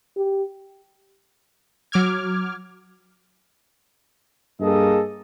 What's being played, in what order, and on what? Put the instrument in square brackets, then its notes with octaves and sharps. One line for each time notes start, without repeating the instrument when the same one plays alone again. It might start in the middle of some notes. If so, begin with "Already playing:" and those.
[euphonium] G4
[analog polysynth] F#3 D6 F6 G#6
[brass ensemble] G2 A#3 G#4 A4 D#5